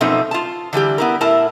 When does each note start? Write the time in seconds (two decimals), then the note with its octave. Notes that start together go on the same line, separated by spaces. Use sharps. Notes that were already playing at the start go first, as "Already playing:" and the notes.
0.01 F#2 B2 F3 A3 C4 D#4
0.31 F4 A5
0.73 D3 E3 G3 G4
0.98 B3 E4 A#4
1.21 A2 E4 A#4 A5